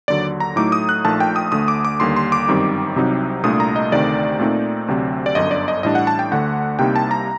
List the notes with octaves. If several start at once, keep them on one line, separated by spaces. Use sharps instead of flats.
D#2 D3 F#3 D5
A#5
A2 F#3 A3 D#4 D6
D#6
F#6
A#1 A#2 A3 D#4 A5
G5
D#6
D2 D3 A3 D#6
D6
D6
D#2 D3 G3 A#3 C6
C6
D6
G1 F#2 D#3 G3 C4
C2 C3 F#3 C4 D#4
C2 A#2 A3 D4 D#6
A#5
D#5
D2 C3 D#3 A3 C4 D5
A#2 A3 C4 D#4
D2 C3 F#3 C4
D5
G1 F#2 D3 D#5
D5
D#5
A1 A2 G3 D4 D#5
F#5
A5
G5
D2 D3 A3 F#5
C2 C3 G3 A#3 D#4 G5
A5
A#5